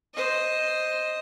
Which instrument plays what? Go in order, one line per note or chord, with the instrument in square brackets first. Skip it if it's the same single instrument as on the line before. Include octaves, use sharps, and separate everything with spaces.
[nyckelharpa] C5 D#5